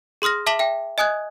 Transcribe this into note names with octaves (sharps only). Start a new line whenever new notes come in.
G#4 C6 D#6 F6 A#6
E5 A5 D6 B6 E7 F#7
E5 G5
D#5 G#5 D#6 F#6 G#6